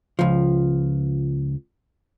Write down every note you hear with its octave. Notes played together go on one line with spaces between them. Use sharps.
C#2 F3